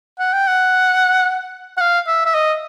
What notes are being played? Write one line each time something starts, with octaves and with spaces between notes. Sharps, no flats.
F#5
G5
F#5
F#5
F5
E5
E5
D#5